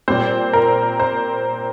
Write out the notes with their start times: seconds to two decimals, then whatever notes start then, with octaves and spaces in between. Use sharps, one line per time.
0.08 A#2 G3 C4 C5
0.53 A#4
1.00 C5